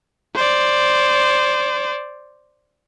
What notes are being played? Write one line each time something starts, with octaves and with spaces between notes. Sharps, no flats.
C5 D5